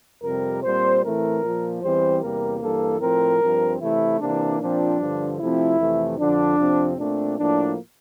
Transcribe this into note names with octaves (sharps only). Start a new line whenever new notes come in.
F2 C3 G3 A#4
A#2 G3 C4 C5
A2 E3 A3 C4 A#4
A#2 F3 A#3
E2 E3 G3 C4 C5
E2 C3 G3 A#3 A#4
G2 E3 A#3 A4
A2 F3 C4 A#4
G2 F3 C4
C3 E3 A3 E4
C3 E3 A#3 D4
A#2 F3 C4 D4
G2 D3 F3
C3 F3 A3 C4 E4
F2 C3 E3 A3
F2 D3 F3 D4
F2 C3 F3 C4
A#2 A3 C4 D4
A2 F3 A#3 D4